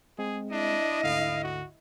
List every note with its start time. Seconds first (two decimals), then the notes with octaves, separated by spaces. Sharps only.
0.19 G#3 C4 G#4
0.52 D4 E4 D#5
1.03 D2 G#2 D3 F5
1.43 F#4